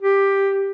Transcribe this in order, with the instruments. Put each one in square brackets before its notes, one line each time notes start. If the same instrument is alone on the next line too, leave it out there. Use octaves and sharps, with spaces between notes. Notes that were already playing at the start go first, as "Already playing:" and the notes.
[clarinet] G4